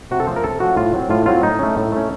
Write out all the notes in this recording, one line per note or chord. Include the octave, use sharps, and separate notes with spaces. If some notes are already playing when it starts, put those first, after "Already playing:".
C3 F#4
A4
F3 A3 C#4 C5
A#4
C3 A4
F3 A3 C#4 F#4
A2 F4
F#3 C4
A2 F4
F#3 C4 F4
A2 D#4
A3 C#4
A2
A3 C#4